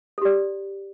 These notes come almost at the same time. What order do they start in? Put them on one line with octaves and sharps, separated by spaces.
A4 G4 D5